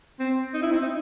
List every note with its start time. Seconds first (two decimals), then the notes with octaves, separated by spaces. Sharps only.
0.19 C4
0.54 D#4
0.62 E4
0.72 C4
0.81 D#4